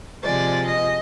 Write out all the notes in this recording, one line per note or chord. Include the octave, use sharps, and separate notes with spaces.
C3 F3 G#3 D5
D#5